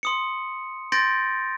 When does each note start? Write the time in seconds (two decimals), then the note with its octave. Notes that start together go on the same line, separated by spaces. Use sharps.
0.03 C6 D#6 C#7
0.92 C6 G6 A6 A#6 D7